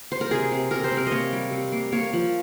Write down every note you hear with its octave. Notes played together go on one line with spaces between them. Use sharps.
C5
A#4
C3 G#4
C3
C3 A#4
C5
C3
A#4
A#3 C#5 D#5
G3
C3
A#3
A#3 C#5
F3